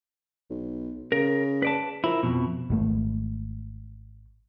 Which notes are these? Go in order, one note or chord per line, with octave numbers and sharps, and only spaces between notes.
B1
C#3 A#4
B4 D5 A5
F3 E4 A#4
F2 B2
G#1 G#2 A3